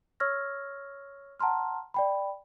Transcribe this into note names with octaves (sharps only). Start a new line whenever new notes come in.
C#5 C#6 E6 F6 G#6 A#6
F#5 A5 A#5 C6 F6
D5 G5 B5